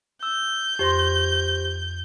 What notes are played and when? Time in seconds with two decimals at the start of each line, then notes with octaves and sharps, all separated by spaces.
0.23 E6 G6
0.79 F2 G4 C5 C6 A#6